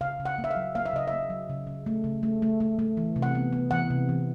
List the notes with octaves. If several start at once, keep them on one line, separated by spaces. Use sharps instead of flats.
C#3 F5
C#3
F#5
A#3
E5
F5
F#3
A#3 F5
E5
C#3 D#5
E5
A#3
F#3
C#3
C#3
A3
C#3
A3
A3
A3
A3
E3
C3
F#5
B3
B3
E3 F#5
C3
E3